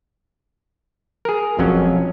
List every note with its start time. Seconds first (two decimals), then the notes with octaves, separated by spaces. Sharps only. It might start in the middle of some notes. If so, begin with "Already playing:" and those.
1.25 G#4 A#4
1.59 E1 F2 F#3 C#4